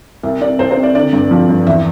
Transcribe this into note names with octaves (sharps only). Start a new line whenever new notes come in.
C2 E5
C3 D5
C2 C5
C5
C3
D5
D3 D5
G2
F3
G2
E2 E5